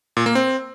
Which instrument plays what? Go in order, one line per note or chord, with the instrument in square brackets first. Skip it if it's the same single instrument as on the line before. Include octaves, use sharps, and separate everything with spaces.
[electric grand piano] A#2
A#3
C4